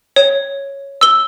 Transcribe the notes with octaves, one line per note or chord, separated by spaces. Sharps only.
C#5
E6 G7